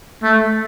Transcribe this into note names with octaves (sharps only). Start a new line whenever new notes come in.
A3